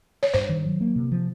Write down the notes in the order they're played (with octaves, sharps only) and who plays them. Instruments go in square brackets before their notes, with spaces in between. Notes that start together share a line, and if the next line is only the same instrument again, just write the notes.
[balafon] C#5
[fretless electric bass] G2 [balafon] C5
[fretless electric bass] D#3
F#3
A#3
C3
F3